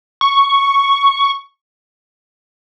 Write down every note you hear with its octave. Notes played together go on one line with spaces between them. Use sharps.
C#6